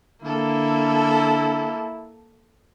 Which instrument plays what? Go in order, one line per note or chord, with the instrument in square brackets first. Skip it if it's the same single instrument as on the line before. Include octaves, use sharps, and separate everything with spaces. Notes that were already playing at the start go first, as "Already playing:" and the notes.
[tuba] D3 [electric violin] A#3 A4 [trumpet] E4